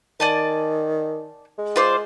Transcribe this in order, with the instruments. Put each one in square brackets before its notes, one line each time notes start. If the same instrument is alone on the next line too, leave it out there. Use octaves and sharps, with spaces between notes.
[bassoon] D#3 [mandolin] D5 G#5 A5
[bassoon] G#3
[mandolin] F4 C5 D5